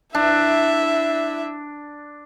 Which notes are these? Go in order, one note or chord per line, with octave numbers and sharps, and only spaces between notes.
D4 E4 E5